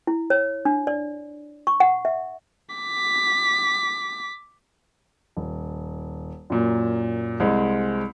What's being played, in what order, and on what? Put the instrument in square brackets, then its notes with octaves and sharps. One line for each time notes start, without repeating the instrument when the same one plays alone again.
[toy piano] E4
C#5
D4
D5
C#6
F#5
E5
[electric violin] D6 B6
[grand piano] D#1
F#2 A#2
C2 G#3 C5